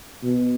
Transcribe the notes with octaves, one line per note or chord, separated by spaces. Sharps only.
B2